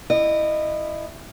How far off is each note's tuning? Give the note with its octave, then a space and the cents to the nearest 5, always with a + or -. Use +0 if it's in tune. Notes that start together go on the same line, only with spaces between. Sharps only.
E4 +0 D#5 -25